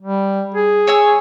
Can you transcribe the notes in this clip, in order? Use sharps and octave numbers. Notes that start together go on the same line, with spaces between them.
G3
G#4
C#5 G#5 E6